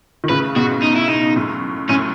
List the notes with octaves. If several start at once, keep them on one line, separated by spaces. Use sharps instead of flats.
D#3
A2 C#3 B4
G#2 B2 F#4
D#4
E4
D#4
F#2 A2
F#2 A2 C#4